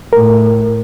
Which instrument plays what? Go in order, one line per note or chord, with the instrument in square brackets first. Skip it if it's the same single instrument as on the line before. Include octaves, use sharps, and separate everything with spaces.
[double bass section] A2 [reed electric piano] A#4